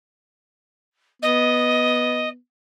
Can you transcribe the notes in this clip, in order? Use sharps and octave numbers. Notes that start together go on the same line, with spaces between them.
B3 D#5